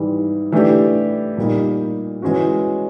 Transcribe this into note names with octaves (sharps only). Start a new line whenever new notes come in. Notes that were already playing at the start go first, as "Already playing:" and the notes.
Already playing: G#2 E3 G3
E3 A3 D4 G4
A#2 G3 A#3 D#4
E3 G#3 C#4 F#4